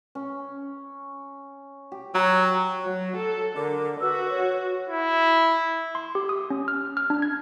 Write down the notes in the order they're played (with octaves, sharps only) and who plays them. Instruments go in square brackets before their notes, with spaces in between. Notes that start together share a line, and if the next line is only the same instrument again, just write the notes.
[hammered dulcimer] C#4
G4
[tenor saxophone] F#3 [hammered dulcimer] A#5
[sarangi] F#3
A4
[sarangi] D3 [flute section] A#4 D6
[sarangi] F#4 [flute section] B4 E6
[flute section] C#5
[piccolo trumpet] E4
[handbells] C6
G4
D#6
C#4
F6
F6
D4
G#6